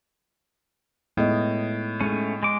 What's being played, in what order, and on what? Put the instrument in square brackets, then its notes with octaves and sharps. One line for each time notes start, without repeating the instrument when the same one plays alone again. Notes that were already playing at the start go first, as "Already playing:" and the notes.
[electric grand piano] A2 [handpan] G#3 B3 D#5
[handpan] G#3 [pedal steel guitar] A3 C#4
[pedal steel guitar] G#3 D6